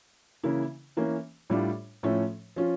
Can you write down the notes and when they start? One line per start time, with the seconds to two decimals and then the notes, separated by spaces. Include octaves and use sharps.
0.43 C#3 E3 A#3 E4
0.97 E3 A#3 C#4
1.50 A2 G3 D4 F4
2.03 A2 F3 A3 C#4
2.56 F3 C#4 F4